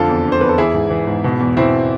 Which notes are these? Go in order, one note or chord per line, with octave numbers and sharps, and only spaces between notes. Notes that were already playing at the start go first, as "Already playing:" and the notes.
Already playing: F2 D3 F4 A4
E2
D3
C5
E2 B4
A4
E3 E4 G#4
G#2
E3
G#2
B2
E2
B2 C4 E4